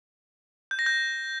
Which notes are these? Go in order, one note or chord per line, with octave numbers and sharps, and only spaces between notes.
G6
A#6
G6